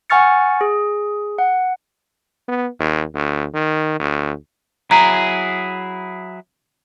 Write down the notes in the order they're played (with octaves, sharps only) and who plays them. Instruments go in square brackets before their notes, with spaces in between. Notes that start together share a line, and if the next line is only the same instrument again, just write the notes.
[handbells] F#5 G#5 C#6 F6 A6 C#7
G#4
F#5
[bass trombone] B3
D#2
D2
D#3
D2
[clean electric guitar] F#3 E4 G#4 [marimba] A#5